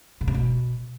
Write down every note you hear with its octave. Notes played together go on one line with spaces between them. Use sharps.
C#3
C3
B2